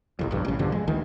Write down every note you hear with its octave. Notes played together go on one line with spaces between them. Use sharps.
G1 C2 F2
B1 G2
A1 C#3
B1 G2 D3 F3
G#3
D2 D#3 E3